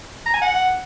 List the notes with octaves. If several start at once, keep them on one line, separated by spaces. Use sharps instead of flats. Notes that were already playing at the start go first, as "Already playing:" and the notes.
A#5
G#5
F#5